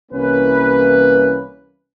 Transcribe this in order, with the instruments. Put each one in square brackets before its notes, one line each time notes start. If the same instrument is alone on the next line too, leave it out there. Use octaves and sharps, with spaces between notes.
[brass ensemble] C2 E3 A#3 C#4 B4